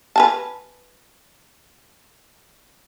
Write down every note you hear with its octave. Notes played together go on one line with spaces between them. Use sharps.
B4 G#5 A5